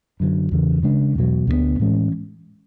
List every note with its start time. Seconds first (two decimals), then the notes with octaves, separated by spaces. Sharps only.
0.20 F#2 D3 F#3
0.51 E2 C#3 E3
0.83 C#3 G#3 D4
1.15 E2 B2 F#3
1.47 D2 D3 F#3 B3
1.79 A2 E3 G#3 C#4